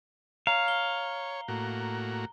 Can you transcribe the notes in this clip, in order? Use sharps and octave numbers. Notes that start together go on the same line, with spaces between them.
C#5 F5 A#5
G7
A2 A#3 F#4